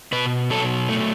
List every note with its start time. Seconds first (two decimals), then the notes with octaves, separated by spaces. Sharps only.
0.12 B2 B4
0.50 F#3 A4
0.89 A3